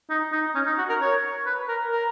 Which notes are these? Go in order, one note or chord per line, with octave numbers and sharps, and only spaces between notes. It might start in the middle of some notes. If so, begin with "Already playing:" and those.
D#4
D#4
C#4
D#4
F#4
A#4
C#5
B4
A#4
A#4